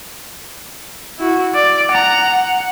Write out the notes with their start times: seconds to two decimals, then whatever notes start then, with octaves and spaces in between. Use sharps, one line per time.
1.19 E4 F#4
1.55 D5
1.91 F#5 A#5
2.32 F#5